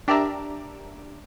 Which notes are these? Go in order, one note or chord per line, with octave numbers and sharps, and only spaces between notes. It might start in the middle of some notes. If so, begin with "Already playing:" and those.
D4 G4 A#4 D5 E5 A#5